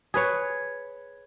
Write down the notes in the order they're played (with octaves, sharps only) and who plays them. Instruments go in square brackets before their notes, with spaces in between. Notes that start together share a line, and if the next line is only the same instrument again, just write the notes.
[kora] G#4 B4 C#5